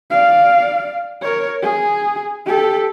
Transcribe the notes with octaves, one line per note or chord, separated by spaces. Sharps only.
D5 F5
A#4 C#5
G#4
G4 A4